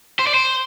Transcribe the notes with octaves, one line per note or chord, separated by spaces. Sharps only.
C5
D5
C5